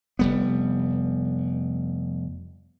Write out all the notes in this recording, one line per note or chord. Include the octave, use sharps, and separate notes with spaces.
F1 G3 B3